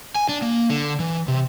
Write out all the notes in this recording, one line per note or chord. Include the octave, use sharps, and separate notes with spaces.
G#5
D4
A#3
D3
E3
C3